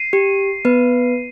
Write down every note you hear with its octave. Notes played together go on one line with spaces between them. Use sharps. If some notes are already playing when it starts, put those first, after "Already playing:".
Already playing: C7 D#7
G4
B3 B4